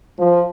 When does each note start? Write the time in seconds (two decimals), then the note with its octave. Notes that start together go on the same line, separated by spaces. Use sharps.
0.19 F3